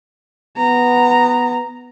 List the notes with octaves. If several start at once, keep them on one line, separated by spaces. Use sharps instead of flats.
B3 A#5